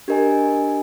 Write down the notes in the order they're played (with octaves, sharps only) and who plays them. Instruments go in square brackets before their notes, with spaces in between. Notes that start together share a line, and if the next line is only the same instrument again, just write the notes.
[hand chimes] D4 G4 A#4 D#5 G#5